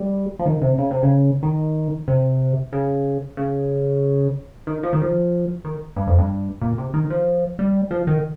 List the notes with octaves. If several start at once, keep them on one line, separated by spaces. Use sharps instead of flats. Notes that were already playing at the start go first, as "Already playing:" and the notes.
Already playing: G3
F3
D#3
C3
C#3
C3
C#3
D#3
C3
C#3
C#3
D#3
F3
D#3
F3
D#3
G2
F2
G2
A#2
C3
D#3
F3
G3
F3
D#3